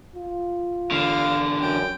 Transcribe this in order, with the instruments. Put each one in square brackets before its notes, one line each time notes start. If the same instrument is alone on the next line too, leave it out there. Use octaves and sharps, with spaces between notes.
[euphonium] F4
[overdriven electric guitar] E2 D3 [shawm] F5
[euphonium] F#2 [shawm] G5